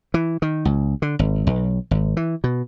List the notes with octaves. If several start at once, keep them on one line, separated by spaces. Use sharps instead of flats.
E3
D#3
C#2
D3
G#1
B1
G#1
E3
B2